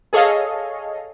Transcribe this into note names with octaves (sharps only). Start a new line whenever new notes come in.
G#4 A4 C#5 D#5 F5